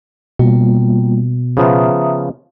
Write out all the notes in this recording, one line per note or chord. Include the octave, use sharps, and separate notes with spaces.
B2 G3 A#3 F4
C#3 F3 B3 E5 A#5 D#6